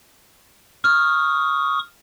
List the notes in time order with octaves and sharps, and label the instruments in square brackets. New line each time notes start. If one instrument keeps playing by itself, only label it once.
[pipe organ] C#6 D#6 [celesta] F6